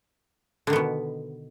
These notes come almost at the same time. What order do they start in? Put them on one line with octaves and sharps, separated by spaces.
D3 D#3 B3 B2